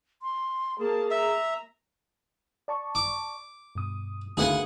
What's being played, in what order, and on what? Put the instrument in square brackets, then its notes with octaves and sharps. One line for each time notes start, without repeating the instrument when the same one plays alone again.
[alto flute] C6
[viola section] A#3 A5 [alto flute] G#4
[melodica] E5 [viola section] A#5
[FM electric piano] D5 A5 C#6
[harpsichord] D6
[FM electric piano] G2 B2 D#6
[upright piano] D2 B4 F5 [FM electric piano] D#3 A#3 [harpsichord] G#4 F#5 G#5